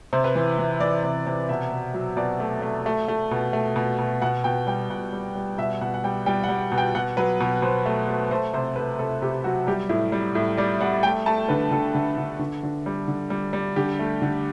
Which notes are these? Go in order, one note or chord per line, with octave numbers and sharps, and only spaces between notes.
C3 C5
B4
E3 C5
E3
E3 D5
C3
C3
B2 E5
B2
F#3
B2 D5
A3
A3
A3
A3
B2
A3
B2
B2
B2 F#5
B2 G5
G3 G5
B2 F#5
G3
G3
B2 E5
B2 F#5
F#5
G3 G5
G3 G5
F#5
G3
B2
G5
B2 F#5
F#3 B4
B2
B2 C5
A3
A3
A3 C5
C3 C5
A3 B4
C3 A4
C3 G4
F#3 F#4
G3 G4
A2 E4
G3
A2
G3 D5
G3 F#5
A3 G5
A3 A5
D3 B4
D3 A4
D3
D3
D3
D3
G3
D3
G3
G3
D3 G4
A3
D3